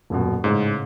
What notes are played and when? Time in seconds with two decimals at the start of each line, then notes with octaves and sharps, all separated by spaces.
0.10 D#1 F#2 B2
0.44 A1 G#2 C#3 G#3